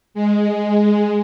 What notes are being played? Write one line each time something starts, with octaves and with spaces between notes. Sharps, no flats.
G#3